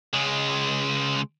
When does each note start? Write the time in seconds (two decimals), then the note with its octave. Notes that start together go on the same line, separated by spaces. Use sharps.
0.13 C#2 G#3